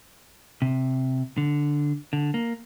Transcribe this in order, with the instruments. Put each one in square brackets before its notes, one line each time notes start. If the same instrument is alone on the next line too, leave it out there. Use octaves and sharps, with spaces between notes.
[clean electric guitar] C3
D3
D3
A#3